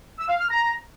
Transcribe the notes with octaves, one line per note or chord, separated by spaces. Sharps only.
E6
F5
F6
A#5